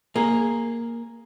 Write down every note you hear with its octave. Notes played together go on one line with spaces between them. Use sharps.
A#3 G#4